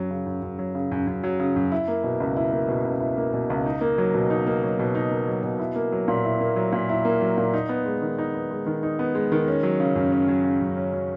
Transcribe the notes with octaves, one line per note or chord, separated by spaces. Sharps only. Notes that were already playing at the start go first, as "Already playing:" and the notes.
Already playing: F#2 F#3
C#3
F#2
F#2
F#3
C#3
F#2
F#2
F#3
C#3
F#2
E4
A#3
B2
C#2
E4
A#3
B2
C#2
E4
A#3
B2
C#2
D#4
A#3
F#3
B2
D#4
A#3
F#3
B2
D#4
A#3
F#3
B2
E4
A#3
F#3
A#2
E4
A#3
F#3
A#2
E4
A#3
F#3
A#2
D#4
B3
G#3
D#3
D#4
B3
G#3
D#3
D#4
B3
G#3
D#3
C#4
F#3
C#3
F#2
C#4
F#3
C#3
F#2
C#4
F#3